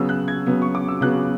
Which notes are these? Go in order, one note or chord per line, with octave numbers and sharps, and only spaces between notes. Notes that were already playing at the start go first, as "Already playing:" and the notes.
Already playing: C#3 F#3 B3 E6
F#6
G#6
C#3 F#3 B3
C#6
D6
E6
C#3 F#3 B3 F#6